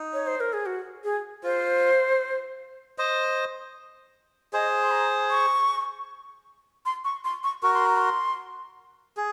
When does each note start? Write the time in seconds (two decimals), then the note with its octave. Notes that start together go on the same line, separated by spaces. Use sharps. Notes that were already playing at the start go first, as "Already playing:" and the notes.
Already playing: D#4
0.14 C#5
0.27 C5
0.40 A#4
0.53 G#4
0.66 F#4
1.04 G#4
1.43 F4 C5
2.98 C5 D#5
4.53 G#4 C5 D#5
4.81 C6
4.92 A#5
5.31 C#6
6.86 C6
7.04 C#6
7.24 C6
7.44 C#6
7.63 F#4 A#4 C#6
7.74 C6
7.86 A#5
7.97 C6
9.17 G#4